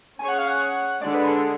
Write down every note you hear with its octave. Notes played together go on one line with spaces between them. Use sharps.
C#4 G#4 C#5 G#5
F#5
F5
F#5
D3 G#3 D4 D5
B4
A4